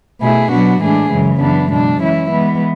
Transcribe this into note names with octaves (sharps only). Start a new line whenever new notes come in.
B2 A3 E4 G#4
B2 F#3 B3 D4 F#4
A2 E3 G#3 D4 G#4
F#2 C#3 E3 G#3
F#2 E3 B3 D4
B2 G#3 D4
E3 G#3 C#4 E4
E3 G#3 B3